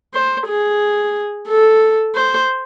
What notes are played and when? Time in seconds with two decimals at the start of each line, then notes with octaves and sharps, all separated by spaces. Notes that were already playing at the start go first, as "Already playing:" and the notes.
0.14 C5
0.47 G#4
1.48 A4
2.15 C5